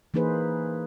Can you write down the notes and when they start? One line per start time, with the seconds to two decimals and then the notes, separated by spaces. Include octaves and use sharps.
0.14 E3 A#3 D#4 G#4 B4 C5